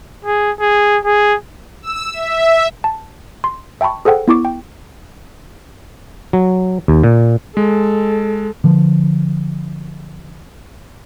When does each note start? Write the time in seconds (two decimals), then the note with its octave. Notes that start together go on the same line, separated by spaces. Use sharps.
0.25 G#4
0.61 G#4
1.05 G#4
1.82 E6
2.13 E5
2.84 A5
3.44 C6
3.81 E5 G5 A5 B5 C#6
4.05 G#4 A4 C5 F#5 G5
4.28 B3 E4 C#6 D6
4.45 G5
6.33 F#3
6.88 D#2
7.04 A#2
7.57 G#3 A4
8.64 D3 F3